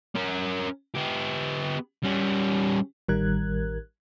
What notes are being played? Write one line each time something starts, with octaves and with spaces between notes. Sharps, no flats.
C#4 A#4
B3 G4
G3 C#4
A1 D#3 G3 A#4 F#6 G#6